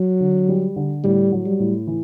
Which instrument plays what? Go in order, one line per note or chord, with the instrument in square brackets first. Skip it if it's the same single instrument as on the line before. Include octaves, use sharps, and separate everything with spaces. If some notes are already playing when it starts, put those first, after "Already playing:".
Already playing: [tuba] F#3
[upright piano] D3
G3
D3
[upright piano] A2 [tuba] G3
[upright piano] F#3
[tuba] G3
[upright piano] A2
E3